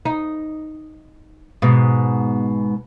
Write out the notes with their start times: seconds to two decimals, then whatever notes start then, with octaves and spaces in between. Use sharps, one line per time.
0.05 D#4
1.62 G#2 B2